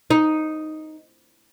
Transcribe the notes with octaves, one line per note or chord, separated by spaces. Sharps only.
D#4